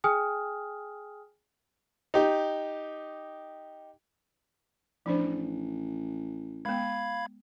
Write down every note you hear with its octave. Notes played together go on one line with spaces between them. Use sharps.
G#4 G5 G#5 D#6 F6
D#4 G4
A1 F3 D4 C5
G#3 B3 F5 B5 G#6